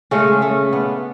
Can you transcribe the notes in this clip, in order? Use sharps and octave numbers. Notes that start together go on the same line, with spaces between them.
C#3 G#3 A3 C#4
A3 C#4
B3 D4